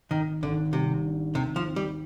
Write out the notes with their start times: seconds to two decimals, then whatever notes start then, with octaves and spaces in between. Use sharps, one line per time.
0.11 G#1 D#3
0.42 G#1 D3
0.73 C3 G3
1.05 D4
1.35 D#2 C3
1.56 F3
1.66 C4
1.76 G3